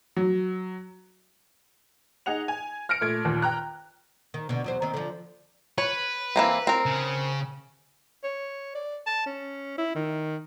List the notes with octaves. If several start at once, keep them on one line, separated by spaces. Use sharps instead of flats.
F#3
D#4 G#4 F#5 F7
G#5
F6 A#6 C#7 D7
A#2 A3 G#6
D#2 A#2
G5 A#5 F#6
D#3
B2 D3
E2 F#3 C5
D#3 C4
D3 F3
B4 C#5
E3 A#3 C4
C4 A#4
C#3
C#5
D5
A5
C#4
E4
D#3